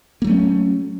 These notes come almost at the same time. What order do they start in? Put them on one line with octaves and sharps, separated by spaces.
A#3 F#3 A3 C#4